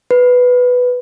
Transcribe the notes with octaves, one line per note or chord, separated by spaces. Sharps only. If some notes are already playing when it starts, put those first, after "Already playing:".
B4